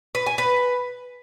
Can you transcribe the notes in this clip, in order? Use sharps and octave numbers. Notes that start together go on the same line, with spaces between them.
B4
G#5
B4